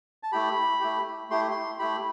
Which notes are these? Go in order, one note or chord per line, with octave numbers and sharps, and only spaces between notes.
A5
A3 E4 G4 B5
A3 E4 G4
A3 E4 G4 C6
C6
A3 E4 G4 B5